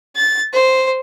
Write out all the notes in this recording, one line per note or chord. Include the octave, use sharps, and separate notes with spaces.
A6
C5